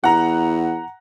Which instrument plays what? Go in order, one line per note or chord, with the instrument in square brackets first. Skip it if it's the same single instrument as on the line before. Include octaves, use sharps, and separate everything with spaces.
[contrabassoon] E2 [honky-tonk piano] F#5 A#5